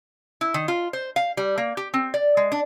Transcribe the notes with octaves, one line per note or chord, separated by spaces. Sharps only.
E4
D#3
F4
C5
F5
G3
A#3
G4
C4
D5
G#3
D4